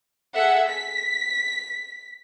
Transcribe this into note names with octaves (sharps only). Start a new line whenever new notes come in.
G#4 A4 E5 F#5
B6